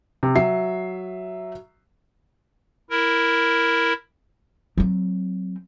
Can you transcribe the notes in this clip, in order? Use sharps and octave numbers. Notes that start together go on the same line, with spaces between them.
C3
F#3 E5 C7
E4 A#4
F#3 C4